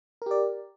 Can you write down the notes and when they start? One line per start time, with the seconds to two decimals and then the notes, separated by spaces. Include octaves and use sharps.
0.22 A#4
0.26 G4
0.31 D5